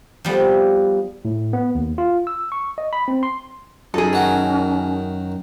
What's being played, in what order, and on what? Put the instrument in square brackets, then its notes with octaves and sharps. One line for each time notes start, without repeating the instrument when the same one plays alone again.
[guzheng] F3 G3 B3
[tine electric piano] A2
B3
D#2
F4
E6
C#6
D#5
B5
C4
C6
[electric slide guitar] F#2 D#4 D#5 [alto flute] C#4 [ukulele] G#4 A4
[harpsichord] D#3 F#4